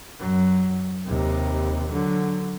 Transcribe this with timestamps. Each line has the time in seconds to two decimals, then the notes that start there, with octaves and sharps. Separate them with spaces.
0.20 F#2 F#3
1.06 D#2 C3
1.91 D3 F#3